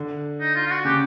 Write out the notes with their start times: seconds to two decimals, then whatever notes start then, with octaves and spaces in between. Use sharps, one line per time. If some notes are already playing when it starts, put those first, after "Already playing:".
Already playing: D3
0.40 D#4
0.55 F4
0.66 F4
0.70 F#4
0.85 C#3 G4